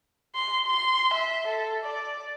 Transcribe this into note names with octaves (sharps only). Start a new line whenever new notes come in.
C6
C6
E5
A4
D5